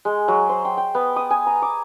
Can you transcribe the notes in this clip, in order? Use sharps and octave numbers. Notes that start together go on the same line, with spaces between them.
G#3
F#3
C5
G5
G5
B3
D#6
G#5
A#5
D6